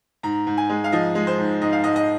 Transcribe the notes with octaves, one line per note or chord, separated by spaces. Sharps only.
G#2 A#5
G#2
G#5
G#3
F5
F3 D#5
G#3
C5
G#2
G#2 D#5
F5
G#2 D#5
D#5